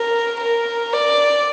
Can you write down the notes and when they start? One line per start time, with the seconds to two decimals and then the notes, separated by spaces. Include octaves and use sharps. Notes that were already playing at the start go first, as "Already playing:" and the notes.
Already playing: A#4
0.40 A#4
0.93 D5